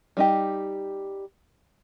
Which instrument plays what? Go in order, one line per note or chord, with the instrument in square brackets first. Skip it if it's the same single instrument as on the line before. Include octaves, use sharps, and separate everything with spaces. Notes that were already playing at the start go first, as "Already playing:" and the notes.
[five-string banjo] G3 D#4 G4